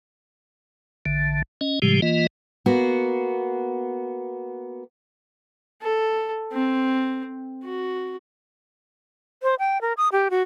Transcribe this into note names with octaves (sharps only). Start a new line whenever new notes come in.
A1 D3
C#4 D#5
A2 C#3 F3 G3 G#3 G4
E3 A#3 F4 D#5
A#3 B3 F#4
A4
C4
F#4
C5
G5
A#4
D#6
G4
F#4